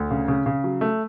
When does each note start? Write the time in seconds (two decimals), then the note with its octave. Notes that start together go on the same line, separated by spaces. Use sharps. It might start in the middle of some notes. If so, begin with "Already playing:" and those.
Already playing: D2
0.11 C#3
0.28 C#3
0.46 C#3
0.64 F#3
0.81 A3